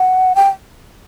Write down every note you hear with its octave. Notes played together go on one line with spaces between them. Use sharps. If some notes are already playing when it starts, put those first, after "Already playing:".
Already playing: F#5
G5